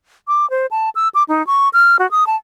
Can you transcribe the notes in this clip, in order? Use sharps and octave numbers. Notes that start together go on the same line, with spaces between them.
D6
C5
A5
E6
D6
D#4
C#6
F6
F#4
D#6
A5